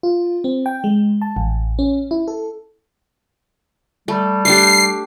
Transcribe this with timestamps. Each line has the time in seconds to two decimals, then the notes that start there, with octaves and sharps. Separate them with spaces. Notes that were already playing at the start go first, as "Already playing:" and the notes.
0.03 F4
0.44 C4
0.66 G5
0.84 G#3
1.22 A5
1.36 A1
1.79 C#4
2.11 E4
2.28 A4
4.08 G3 A3
4.45 A3 D4 G4 C7